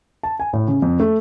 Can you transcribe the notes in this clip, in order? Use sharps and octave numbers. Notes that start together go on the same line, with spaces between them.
A5
G#5
A2
C#3
F2
A3